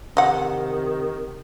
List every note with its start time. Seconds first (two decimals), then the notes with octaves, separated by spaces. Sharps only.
0.17 C3 D#3 D#5 F#5